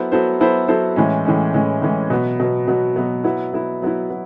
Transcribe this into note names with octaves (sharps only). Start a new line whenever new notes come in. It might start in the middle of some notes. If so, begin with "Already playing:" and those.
Already playing: F#3 B3 E4 A4 C5
F#3 B3 E4 A4 C5
F#3 B3 E4 A4 C5
F#3 B3 E4 A4 C5
A2 E3 G#3 C#4
A2 E3 G#3 C#4
A2 E3 G#3 C#4
A2 E3 G#3 C#4
B2 F#3 B3
B2 F#3 B3
B2 F#3 B3
B2 F#3 B3
F#3 B3 E4
F#3 B3 E4
F#3 B3 E4
F#3 B3